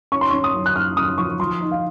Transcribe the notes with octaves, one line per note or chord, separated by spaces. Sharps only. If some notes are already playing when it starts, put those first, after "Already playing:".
C#4 C#6
C6
C#4 C#6
D#6
F#2
F#6
F#2 F6
F#2 D#6
F3 C#6
F3 C6
D#4
F5